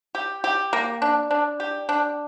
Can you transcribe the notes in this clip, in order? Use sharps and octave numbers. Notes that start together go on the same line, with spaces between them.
G4
G4
A#3
D4
D4
G4
D4